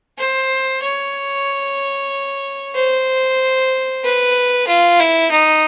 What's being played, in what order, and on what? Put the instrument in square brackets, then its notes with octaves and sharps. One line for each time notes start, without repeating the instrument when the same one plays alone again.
[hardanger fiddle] C5
C#5
C5
B4
F4
E4
D#4